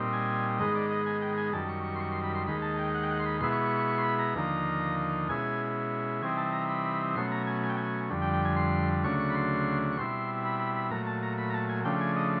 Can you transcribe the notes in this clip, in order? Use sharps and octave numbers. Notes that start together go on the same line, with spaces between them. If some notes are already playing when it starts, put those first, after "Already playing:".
Already playing: A#2 G3 C4 D#4
G#5
G#2 D#3 G#3 B3 D#5
D5
D#5
G#5
G5
G#5
F#2 D#3 G3 A5
C#6
C#6
C6
C#6
C6
B5
C6
D#2 D#3 G#3 B5
A5
G5
F#5
G5
F#5
C6
B5
B2 G#3 B3 E4 C6
C#6
C#6
C#6
C#6
C6
B5
A#5
D#2 D3 F3 A#3 D#4
B2 G#3 C#4 E4 G#5
C3 E3 G3 C4 D#4 G#5
A5
A#5
B5
B2 F#3 A3 C#4 C6
A#5
G#5
G#5
G5
G#5
F2 D3 G3
G5
G5
G#5
C6
D2 C#3 F#3 A3 D4 C#6
C#6
B5
C6
C#6
B2 G3 C4 E4 C6
B5
B5
B5
A#2 F#3 A3 A#5
A5
A#5
B5
A#5
A5
G#5
C#3 F3 A3 D4 G5
G#5
D#5